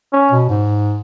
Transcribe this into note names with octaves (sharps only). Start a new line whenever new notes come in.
C#4
B2
G#2